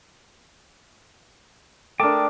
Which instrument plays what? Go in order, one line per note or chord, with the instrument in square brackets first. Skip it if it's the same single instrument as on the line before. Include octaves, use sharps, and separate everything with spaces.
[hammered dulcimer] A3 D4 [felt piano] A4 A#4 [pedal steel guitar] G5 A5 D#6 [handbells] D6